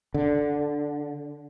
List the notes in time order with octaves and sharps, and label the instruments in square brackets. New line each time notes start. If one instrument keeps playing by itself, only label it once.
[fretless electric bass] D3